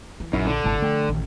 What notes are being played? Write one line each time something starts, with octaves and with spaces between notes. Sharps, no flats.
E3
A#1 F#2 C#4 D#4 E4
D3
G1 C2 A2 E4 A5
F3 A3 A4 G5
A1 D#3